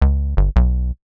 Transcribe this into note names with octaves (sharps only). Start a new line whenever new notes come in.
C#2
G1
B1